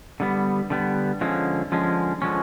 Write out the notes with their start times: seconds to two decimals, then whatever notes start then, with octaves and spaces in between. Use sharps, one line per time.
0.20 D3 G3 B3
0.70 D3 G3 B3
1.21 D3 F3 G#3 C#4
1.72 D3 F3 G#3 C#4
2.22 D3 F3 G#3 C#4